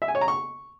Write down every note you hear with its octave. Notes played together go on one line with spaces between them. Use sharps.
E5
G#5
C#5
A#5
C#6